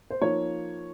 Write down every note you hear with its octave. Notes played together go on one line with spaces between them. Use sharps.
C5
F3 A#3 D#4 C#5